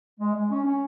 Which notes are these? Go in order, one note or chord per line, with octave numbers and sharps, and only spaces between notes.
G#3
G#3
C#4
C#4